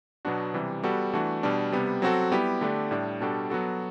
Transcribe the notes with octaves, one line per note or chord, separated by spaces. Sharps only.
B2 F#3 B3 D4 F#4
C3 E3 G3
G3 B3 F#4 A4
E3 A3 D4 F#4
B2 G3 D4
C3 G3 B3
F#3 C4 F#4 A4
G3 B3 E4 G4
D3 A3 D4 G4
A2 G3 D4
B2 G3 D4 F#4 A4
F#3 B3 F#4 A4